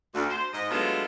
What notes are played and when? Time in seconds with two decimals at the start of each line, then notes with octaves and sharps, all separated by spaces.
0.14 D2
0.29 C5
0.53 G#2 D#5
0.71 F#3 G#3 A3 B3 D4 F4